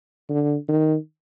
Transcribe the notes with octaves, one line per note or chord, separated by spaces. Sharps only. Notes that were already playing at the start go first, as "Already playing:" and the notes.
D3
D#3